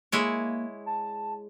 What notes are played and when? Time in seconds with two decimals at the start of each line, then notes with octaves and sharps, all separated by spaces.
0.12 G#3 A#3 E4 C#5
0.86 A5